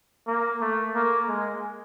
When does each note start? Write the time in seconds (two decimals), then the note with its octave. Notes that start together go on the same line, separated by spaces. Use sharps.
0.27 A#3
0.61 A3
0.95 A#3
1.28 G#3